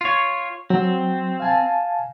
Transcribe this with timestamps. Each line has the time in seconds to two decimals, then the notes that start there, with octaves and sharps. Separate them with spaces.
0.01 F4 C#5
0.70 F#3 C4
1.40 F5 G#5 A5